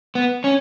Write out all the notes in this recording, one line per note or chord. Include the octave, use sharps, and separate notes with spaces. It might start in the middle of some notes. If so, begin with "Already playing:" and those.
B3
C#4